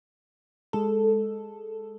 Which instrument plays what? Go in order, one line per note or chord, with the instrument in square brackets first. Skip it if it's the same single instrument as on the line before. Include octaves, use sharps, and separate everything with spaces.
[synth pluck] G#3 A4